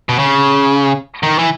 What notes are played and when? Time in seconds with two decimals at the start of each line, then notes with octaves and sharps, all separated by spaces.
0.09 B2
0.19 C#3
1.23 D#3
1.39 E3